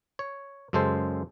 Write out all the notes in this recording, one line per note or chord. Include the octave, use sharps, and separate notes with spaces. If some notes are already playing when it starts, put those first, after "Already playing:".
C#5
F#2 C#3 G#3 A4 C5